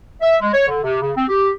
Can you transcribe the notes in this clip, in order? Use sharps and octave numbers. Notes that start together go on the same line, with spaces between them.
E5
G#3
C#5
D3
C3
C#3
C4
G4